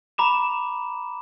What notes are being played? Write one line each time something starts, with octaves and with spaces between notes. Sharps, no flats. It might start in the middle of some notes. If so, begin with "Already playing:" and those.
A#5 B5 D6 E7